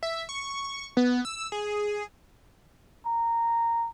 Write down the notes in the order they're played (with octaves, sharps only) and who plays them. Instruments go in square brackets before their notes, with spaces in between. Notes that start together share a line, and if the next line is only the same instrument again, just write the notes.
[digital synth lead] E5
C#6
B3
E6
G#4
[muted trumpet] A#5